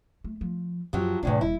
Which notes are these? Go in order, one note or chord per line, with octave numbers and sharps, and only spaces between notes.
A3
F3
F#2 F3 F#3 G4
E2 A2 C3 D#3 D4
D#1 E4